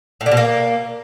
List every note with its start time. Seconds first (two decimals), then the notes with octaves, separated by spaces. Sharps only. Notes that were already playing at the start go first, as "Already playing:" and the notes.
0.21 A2
0.26 D3
0.31 B2
0.37 A#3